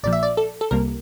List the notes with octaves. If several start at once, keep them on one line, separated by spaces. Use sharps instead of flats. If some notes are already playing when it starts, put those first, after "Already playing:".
A#1 A#2 F3 D5
E5
D5
A4
A4
C2 C3 G3 A#3 A#4